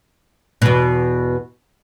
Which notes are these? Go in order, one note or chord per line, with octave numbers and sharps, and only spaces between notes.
E2 B2